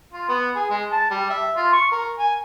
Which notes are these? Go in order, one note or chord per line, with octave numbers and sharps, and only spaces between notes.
F4
B3
G#4
G#3
A5
G3
E5
F4
C#6
A#4
G#5